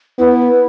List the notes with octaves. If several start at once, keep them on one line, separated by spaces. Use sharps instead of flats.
B3 E4